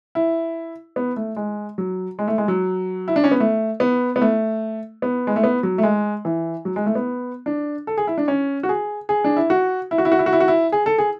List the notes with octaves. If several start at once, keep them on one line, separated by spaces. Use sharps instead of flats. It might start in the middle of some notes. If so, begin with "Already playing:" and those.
E4
B3
A3
G#3
F#3
G#3
A3
G#3
F#3
E4
D4
C#4
B3
A3
B3
B3
A3
B3
G#3
A3
B3
F#3
A3
G#3
E3
F#3
G#3
A3
B3
D4
A4
G#4
E4
D4
C#4
F#4
G#4
G#4
D4
E4
F#4
E4
F#4
E4
F#4
E4
F#4
E4
F#4
E4
G#4
A4
G#4